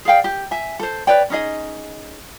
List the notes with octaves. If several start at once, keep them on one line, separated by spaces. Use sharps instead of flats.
G#4 D5 F5 G5
G4
E5 G#5
A4 C5
B4 C#5 D5 G5
C#4 D#4 G#4 D#5